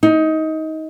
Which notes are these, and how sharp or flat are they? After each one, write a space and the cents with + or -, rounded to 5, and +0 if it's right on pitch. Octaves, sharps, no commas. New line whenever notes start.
D#4 +20